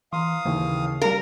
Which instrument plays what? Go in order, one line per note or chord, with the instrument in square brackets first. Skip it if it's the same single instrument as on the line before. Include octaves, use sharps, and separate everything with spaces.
[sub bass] E3 [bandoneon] F5 D#6 [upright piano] A#5 C6
[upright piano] D#2 E3 [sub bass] C#3
[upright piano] G3 F5 [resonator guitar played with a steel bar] A#4